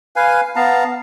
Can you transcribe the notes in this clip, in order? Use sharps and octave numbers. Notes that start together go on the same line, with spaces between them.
B4 F5 G#5
B3 F5 A5 A#5